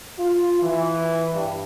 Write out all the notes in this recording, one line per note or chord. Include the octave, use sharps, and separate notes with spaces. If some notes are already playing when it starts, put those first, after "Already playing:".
F4
E3
G2